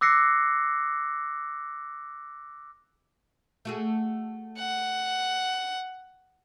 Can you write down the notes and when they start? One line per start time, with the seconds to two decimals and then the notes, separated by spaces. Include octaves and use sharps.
0.01 D6 E6 F#6 A#6 C7 C#7
3.65 A3 F#4 G#4
4.59 F#5